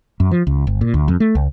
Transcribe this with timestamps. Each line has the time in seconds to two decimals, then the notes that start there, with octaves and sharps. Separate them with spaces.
0.20 F#2
0.31 F3
0.47 C#2
0.67 G1
0.81 A#2
0.94 D2
1.08 F2
1.20 A3
1.35 C#2